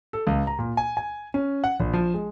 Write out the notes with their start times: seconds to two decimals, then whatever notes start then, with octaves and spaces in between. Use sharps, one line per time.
0.13 A4
0.27 C#2
0.47 A#5
0.59 A#2
0.77 G#5
0.97 G#5
1.34 C#4
1.64 F#5
1.80 A#1
1.94 F3
2.14 G#3